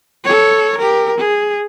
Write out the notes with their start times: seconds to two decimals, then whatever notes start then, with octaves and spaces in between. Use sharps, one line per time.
0.24 A4 C#5
0.78 G4 A#4
1.18 G#4